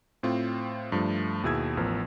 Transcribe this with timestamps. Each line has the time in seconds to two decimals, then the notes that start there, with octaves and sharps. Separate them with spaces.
0.23 A2 C4 F4
0.92 G2 F3 A3
1.43 D#2 B2 E4 G#4 E6 G#6
1.77 A1 F3 B3 A#4